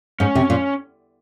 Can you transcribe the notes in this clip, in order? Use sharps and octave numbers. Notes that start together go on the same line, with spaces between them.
G#2 C#4
C3
A#2